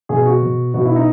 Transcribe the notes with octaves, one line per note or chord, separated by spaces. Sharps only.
B2 G#4
F#4
B2
B2 F#4
E4
D#4